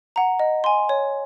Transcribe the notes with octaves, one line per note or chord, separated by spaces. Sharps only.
F#5 A#5
D#5
G#5 C6
C#5